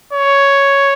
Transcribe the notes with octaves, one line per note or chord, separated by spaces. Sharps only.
C#5